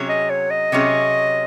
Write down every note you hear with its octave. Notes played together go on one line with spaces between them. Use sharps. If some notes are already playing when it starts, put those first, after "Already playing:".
Already playing: C3 F#3 C#4 G#4
D#5
C#5
D#5
C3 F#3 C#4 G#4